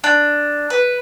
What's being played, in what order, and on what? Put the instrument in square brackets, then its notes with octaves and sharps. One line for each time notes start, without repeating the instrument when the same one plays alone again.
[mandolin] D4
B4